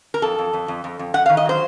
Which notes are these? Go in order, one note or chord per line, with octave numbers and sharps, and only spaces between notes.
A#4
F2 A4
F2
F2
F2
F2
F2
F#2 F#5
F5
D#3
D#5
F#3 C5